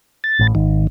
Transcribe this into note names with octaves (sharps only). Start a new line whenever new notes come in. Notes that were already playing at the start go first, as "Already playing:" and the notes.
A6
A1 A2
G#1 D#3